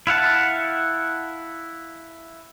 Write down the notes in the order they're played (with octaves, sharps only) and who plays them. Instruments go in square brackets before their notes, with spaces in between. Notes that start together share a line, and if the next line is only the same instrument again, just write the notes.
[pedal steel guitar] E4 F5 F#5 A5